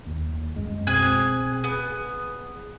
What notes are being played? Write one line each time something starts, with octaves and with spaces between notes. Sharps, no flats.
D#2
C2 F#2 G#3
B2 C4 G#4 G#5 F#6
B3 G#4